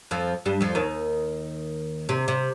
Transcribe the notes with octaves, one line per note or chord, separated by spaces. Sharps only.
F2 F3
G2 G3
F2 F3
D#2 D#3
C3
C3